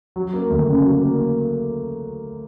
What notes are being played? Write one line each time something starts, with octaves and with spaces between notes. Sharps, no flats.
F#3
A#3
D2
C#3
F#3
A#3